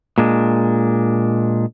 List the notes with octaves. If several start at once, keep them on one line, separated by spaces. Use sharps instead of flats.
A#2 G#3 D4